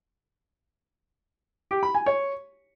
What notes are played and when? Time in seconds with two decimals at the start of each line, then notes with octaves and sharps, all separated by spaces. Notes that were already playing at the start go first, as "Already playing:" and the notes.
1.71 G4
1.83 B5
1.95 G#5
2.06 C#5